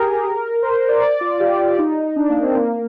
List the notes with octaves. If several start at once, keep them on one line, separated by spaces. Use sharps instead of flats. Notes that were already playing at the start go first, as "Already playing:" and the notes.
Already playing: G4 G#4 A#4
C5
C5
D5
D5
F4
G4
D#4
D4
A#3
C4
A#3